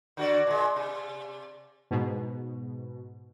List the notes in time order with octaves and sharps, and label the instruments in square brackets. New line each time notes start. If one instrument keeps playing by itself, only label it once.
[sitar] D3 F#4 D5
A#2 G#3
C3
[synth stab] G#2 B2